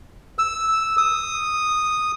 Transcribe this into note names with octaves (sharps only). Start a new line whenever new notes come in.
E6
D#6